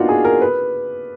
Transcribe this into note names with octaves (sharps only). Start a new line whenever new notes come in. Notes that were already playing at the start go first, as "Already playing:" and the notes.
Already playing: A#3 B3 D4 D#4 F4 F#4
G#4
A#4
B4